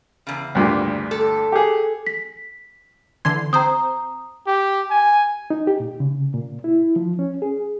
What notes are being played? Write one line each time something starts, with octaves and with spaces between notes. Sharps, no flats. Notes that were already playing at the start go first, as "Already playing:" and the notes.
E2 C#3
D2 G2 A#2
A4
G4 G#4
B6
D3 E3 C6 G#6
C4 C5 A#5 D#6
G4
G#5
D#4
G4
A#2
C#3
A#2
E4
F3
C#4
G#4